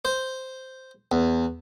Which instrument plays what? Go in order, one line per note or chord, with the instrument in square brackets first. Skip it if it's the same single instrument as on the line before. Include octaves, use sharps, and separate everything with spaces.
[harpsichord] C5
E2